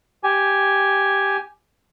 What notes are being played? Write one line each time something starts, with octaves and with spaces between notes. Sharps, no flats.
G4 G#5